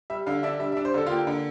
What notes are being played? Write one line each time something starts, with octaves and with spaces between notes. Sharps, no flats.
G3 E5
D3 F5
D4 E5
G3 E5
E5
D4
C5
D3 A4
F4
A#3 G4
D3